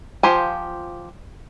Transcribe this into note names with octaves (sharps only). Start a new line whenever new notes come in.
F3 F4 G4 C5 G#5